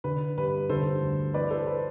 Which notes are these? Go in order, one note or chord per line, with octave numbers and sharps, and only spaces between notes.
D3 B4
G2 B4
D3 A4 C5
D2
E3 B4 D5
A4 C5
B4